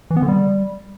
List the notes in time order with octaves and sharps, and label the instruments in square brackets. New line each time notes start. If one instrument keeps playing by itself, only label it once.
[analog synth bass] E3
B3
D3
G3